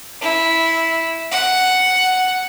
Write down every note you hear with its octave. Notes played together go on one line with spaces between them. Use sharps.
E4
F#5